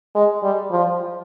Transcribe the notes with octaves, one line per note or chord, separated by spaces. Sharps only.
G#3
G3
F3